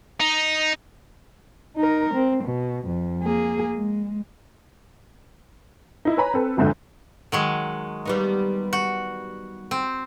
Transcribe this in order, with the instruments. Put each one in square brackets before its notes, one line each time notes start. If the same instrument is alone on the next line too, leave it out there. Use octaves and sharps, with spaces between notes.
[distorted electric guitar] D#4
[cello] D#4 A#4
C4
B2
F2
A#3 G#4
G#3
[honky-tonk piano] D#4 E4
B4 C#5 G#5 A#5 B5
C4 A4 B4
G1 F2 G#2 D3 E5 G6
[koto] D#3 F#3 G#3
[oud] G3 B3 D#4
[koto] F#4
C4